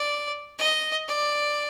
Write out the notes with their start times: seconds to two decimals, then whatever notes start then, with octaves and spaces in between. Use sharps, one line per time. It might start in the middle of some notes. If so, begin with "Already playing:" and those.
Already playing: D5
0.59 D#5
1.08 D5